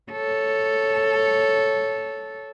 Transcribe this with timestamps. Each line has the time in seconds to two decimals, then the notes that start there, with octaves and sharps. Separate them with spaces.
0.12 A4 C#5